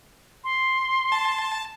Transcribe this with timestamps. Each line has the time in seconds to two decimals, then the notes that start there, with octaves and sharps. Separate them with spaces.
0.44 C6
1.12 A5